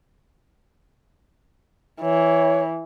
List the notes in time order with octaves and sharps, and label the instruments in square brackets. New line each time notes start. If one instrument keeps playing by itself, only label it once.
[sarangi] E3 [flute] C#5